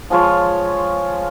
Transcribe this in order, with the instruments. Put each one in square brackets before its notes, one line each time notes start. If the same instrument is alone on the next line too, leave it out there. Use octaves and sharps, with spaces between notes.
[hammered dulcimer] F3 G#3 F4 C#5